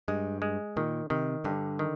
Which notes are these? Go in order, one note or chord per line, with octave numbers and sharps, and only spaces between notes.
G2 G#3
G#3
A#2 D#3
C3 D#3
G2 D3
D#3